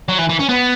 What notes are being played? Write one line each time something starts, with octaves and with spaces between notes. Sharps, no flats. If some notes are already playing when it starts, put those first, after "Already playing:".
F#3
E3
E3
C#4
B3